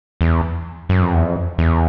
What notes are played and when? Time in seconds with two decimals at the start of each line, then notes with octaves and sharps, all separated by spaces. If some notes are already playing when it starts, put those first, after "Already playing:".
0.21 E2
0.89 F#2
1.02 F2
1.14 E2
1.26 F2
1.58 E2